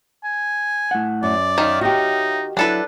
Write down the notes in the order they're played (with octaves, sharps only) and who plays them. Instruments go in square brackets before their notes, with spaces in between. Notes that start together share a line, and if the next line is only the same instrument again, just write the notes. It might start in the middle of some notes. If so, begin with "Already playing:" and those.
[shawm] G#5
[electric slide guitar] A2 F#5
[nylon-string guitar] F#2 [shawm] D5
[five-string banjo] D#3 [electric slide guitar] C#5 E5 F5
[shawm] D#4 [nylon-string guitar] F#4 G4
[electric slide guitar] F#3 E4 [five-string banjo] D4 A4 B4